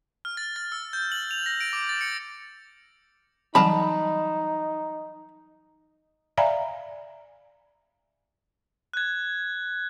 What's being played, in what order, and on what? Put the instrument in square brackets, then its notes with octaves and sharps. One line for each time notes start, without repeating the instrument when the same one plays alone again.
[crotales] F6
A6
A6
E6
G6
F#7
F7
A#6
D7
D6
A6
C#7
[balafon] E3 F#3 G3 [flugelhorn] D#4 [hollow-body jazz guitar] A5 B5
[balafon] D5 E5 F5 G#5 A#5 B5
[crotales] F#6 G#6